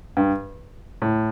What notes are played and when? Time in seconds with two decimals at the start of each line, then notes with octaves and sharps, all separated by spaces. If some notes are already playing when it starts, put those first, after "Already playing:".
0.17 G2
1.02 A2